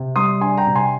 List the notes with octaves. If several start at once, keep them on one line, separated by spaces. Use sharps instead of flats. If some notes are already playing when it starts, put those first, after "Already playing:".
Already playing: C3
G3 C6 D#6
D4 G#5 C6
G5 A#5
C3
G#5 C6